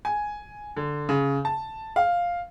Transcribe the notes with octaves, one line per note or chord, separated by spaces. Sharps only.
G#5
D3
C#3
A5
F5